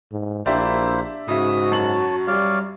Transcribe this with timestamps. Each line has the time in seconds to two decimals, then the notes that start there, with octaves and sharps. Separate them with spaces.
0.12 G#2
0.46 A#1 A#3 D4 E4 G4 C5 E5
1.28 G#2 C#3 F#4 E5 D#6
1.72 F#2 C#5 A5 F#7
2.27 G3 C#5 D5 F5